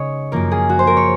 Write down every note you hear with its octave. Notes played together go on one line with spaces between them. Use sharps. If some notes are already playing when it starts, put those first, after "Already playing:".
Already playing: C#3 G#3 D#4 C#5 D#5
F#2 F3 A#3 A#4
G#4
F#4
C5
A#4
C#5